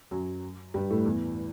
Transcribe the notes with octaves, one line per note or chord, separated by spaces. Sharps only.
F#2 F#3
G2 G3
A2 A3
E2 E3